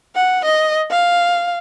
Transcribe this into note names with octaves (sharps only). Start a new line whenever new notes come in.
F#5
D#5
F5